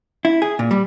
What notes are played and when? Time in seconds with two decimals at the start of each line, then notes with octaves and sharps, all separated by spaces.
0.25 E4
0.42 G#4
0.59 A#2
0.71 G3